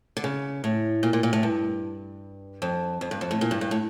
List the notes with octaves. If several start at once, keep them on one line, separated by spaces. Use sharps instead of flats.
D3
C#3
A2
A#2
A#2
A#2
A2
G2
F2
F2
G2
F2
A2
A#2
G2
G2
A2